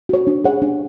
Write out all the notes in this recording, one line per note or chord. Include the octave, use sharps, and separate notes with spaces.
F#4 C#5
D4
G#4 C#5 F#5
D4